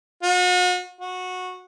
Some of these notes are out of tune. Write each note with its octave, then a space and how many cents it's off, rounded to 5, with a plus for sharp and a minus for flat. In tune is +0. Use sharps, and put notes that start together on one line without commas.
F#4 -40
F#4 -15